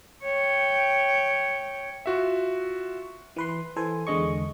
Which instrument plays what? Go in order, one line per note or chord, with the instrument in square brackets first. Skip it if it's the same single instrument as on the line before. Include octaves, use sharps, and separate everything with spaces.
[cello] C#5 G5
[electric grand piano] F4 F#4 E5
[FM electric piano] E3 B4 C6
E3 A4 C5 G#5
E2 D3 G#3 D#5 C#6